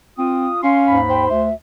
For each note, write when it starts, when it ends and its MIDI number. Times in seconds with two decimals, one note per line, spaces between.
0.18 0.48 60
0.18 0.59 65
0.18 0.59 87
0.63 0.98 61
0.63 1.01 77
0.63 0.81 84
0.87 1.28 39
0.87 1.28 44
0.87 1.28 83
1.09 1.46 72
1.09 1.25 79
1.29 1.50 38
1.29 1.53 76